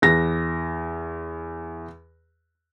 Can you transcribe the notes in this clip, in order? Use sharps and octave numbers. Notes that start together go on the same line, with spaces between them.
E2 A#6